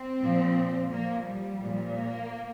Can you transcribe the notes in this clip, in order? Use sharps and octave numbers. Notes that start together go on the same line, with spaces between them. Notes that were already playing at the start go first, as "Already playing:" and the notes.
Already playing: C4
A#2 F3
A#2 F3 A#3
G3
A#2 F3
A#3